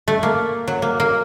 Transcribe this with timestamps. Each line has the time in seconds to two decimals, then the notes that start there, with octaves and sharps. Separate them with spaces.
0.08 A3
0.23 A#3
0.68 F#3
0.82 A#3
1.00 A#3